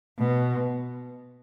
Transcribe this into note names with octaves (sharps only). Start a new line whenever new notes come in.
B2